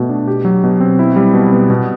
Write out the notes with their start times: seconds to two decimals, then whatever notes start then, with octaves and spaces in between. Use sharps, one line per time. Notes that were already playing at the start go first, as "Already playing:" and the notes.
Already playing: B2 A3 F#4
0.09 D4
0.28 G4
0.45 F#3
0.64 B2
0.80 C4
0.99 E4
1.16 G3
1.34 B2
1.52 B3
1.70 B2